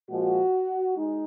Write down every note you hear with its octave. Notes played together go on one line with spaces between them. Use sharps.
A#2 F3 G#3 F#4
G#3 D#4